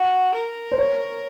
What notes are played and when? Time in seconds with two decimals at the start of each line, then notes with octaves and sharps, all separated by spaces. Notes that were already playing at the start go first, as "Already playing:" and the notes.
Already playing: F#4
0.34 A#4
0.72 C5
0.78 C#5